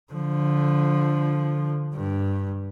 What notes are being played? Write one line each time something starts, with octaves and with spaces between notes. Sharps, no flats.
D3 F3
G2